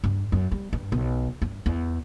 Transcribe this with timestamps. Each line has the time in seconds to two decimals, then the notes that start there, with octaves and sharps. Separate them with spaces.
0.04 G2
0.32 F#2
0.52 G3
0.73 G2
0.92 B1
1.42 G2
1.66 E2